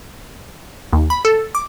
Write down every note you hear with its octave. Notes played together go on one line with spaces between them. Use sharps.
D#2
B5
A4
D6